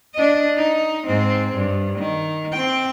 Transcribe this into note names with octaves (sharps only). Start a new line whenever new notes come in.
D4 D#5
D#4
G#2 C4
G2
D#3
C4 G5